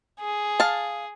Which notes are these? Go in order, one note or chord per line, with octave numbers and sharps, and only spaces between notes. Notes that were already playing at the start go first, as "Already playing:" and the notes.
G#4
F5 A5